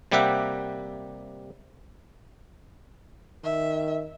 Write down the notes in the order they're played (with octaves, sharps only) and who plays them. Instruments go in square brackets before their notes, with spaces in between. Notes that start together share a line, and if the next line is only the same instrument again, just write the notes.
[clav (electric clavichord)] C3 G3 A#3 G4 E5 F#5
[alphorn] D#3 [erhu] E5